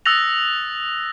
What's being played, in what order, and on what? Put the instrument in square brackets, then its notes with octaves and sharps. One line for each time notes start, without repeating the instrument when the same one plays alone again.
[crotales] D#6 E6 F#6 A6 A#6 F7